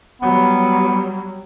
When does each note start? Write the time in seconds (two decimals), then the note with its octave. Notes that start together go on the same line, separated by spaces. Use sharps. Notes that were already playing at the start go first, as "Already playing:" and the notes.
0.21 F#3 G3 B3